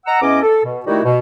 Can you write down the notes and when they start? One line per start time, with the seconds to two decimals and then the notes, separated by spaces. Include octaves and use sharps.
0.06 D#5 F#5 A#5 E6
0.22 E2 C#4 D#5 D6
0.42 A4
0.64 B2
0.86 D#3 G3 A3 D#4 E4 F#4
1.04 B2